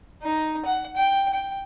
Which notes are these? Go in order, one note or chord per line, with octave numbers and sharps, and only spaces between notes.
D#4
F#5
G5
G5